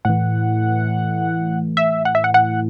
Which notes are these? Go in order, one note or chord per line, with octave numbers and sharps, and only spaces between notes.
A2 E3 F#5
E5
F#5
E5
F#5
F#5